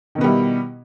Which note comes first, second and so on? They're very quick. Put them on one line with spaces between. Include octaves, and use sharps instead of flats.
D#3 B2 B3 G3 E4